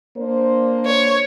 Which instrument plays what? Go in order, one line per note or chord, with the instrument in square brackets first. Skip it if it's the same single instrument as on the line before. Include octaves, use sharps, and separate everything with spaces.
[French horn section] A#3 D4 C5
[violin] C#5